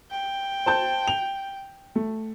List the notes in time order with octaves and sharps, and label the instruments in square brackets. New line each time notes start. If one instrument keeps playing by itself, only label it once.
[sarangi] G5
[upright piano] C5 A5 G6
F7
A3